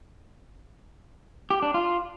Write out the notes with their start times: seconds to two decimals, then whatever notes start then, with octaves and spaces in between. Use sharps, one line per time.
1.50 G4
1.62 D4
1.74 F4